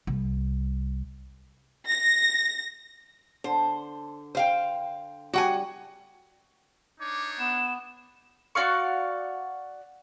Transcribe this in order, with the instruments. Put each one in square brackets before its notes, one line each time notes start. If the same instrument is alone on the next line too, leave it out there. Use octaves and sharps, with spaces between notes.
[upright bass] C2
[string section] A#6
[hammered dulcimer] D3 [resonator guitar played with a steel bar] C5
[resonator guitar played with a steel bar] C5 F5 G5
[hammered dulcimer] G3 [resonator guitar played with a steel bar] F#4 F#5 G#5
[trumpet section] D4 D#4 C#5 [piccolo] D6
[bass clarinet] B3 [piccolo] E7
[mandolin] F#4 D5 F5 C#6